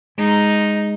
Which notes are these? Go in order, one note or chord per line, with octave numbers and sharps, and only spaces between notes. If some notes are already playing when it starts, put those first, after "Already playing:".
G#3 D#4